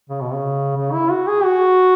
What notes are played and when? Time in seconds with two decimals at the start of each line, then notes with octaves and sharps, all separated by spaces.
0.10 C#3
0.21 B2
0.33 C#3
0.76 C#3
0.93 E4
1.11 F#4
1.28 G#4
1.44 F#4